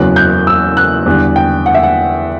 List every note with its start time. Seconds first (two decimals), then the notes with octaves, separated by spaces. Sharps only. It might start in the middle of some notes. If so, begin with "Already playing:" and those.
Already playing: F#1 E2 C#3 F#3 F#6
0.16 G6
0.47 E6
0.77 F#6
1.06 E2 D3 G3
1.36 G5
1.66 F#5
1.75 E5
1.83 F#5